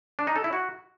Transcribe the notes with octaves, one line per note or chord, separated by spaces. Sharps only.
D4
D#4
A4
E4
F#4